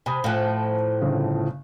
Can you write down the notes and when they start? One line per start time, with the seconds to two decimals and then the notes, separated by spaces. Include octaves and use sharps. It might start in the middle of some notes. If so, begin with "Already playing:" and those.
0.06 C3 G#5 B5 D#6
0.24 A2 F3 F5 G#5 F#6
1.01 G1 C#3